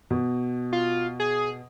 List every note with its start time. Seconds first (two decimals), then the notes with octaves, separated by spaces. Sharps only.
0.11 B2
0.73 F4
1.20 G#4